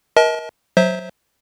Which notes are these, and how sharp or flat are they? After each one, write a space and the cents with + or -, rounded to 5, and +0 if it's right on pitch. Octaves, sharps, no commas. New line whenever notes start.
A#4 +30 D#5 +35 A5 -25
F#3 +0 C5 +0 E5 -15